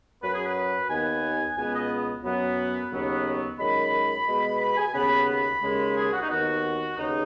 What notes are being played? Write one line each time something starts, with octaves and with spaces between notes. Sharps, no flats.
F#2 F#3 C#4 B4
G#4
B4
D#2 D#3 B3 G#5
C#2 B2 B3 G#5
D#5
F#2 F#3 B3
B5
D#2 C#3 F#3 B3
F#2 D#3 G#3 C#4 B5
B2 G#3 B3
B5
G#5
D#2 C#3 B3 B5
B5
D#2 C#3 G#3
G#4
F#4
D#4
D#2 D#3 B3 F#4
D#2 C#3 B3 D#4